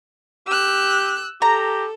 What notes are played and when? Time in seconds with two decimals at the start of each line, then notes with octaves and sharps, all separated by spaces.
0.48 G4 E6 F#6
1.42 G4 A4 A#5